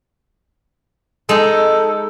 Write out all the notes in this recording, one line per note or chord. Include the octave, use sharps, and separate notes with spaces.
G#3 D#4 A4